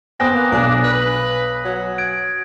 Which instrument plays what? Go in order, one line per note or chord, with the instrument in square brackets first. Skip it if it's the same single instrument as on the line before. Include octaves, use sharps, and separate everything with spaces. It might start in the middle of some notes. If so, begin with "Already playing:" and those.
[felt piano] B3 G#5 [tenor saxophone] C4 [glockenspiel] D#6 F#6 A#6
[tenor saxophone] A#3
[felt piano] B1 G#5 [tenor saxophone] D4
[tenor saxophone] B4
F#3
[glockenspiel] G#6 D7